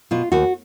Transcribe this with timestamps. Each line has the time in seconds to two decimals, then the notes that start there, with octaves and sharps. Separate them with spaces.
0.11 B2 F4
0.32 D#2 F#4